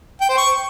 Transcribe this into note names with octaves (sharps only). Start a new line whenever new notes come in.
G5
C5
C#6